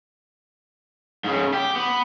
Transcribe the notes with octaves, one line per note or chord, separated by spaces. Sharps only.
G#2 C#3
G4
B3